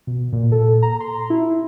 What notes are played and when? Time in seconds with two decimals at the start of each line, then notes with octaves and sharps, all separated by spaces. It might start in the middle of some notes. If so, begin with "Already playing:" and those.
0.07 B2
0.33 A#2
0.52 A4
0.82 A#5
1.00 C6
1.30 E4